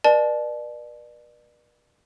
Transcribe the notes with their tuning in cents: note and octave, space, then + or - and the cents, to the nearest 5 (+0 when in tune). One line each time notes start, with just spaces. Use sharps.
B4 -45 D5 +35 A5 -35